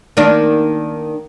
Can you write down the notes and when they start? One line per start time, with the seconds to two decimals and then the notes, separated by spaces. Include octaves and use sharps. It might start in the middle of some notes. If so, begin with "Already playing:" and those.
0.17 D#3 A#3 D4